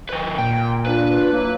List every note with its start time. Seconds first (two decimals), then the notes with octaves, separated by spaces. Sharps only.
0.09 D#3 B4
0.38 A#2 G5
0.86 D4 F4 B4
1.31 E3 F#3 A#3